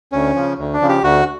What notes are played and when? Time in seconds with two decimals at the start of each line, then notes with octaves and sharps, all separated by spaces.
0.12 D2 C#4
0.36 C#3 F3
0.58 D2
0.74 D4
0.82 C#3 F3
0.89 G4
1.03 D2 F#4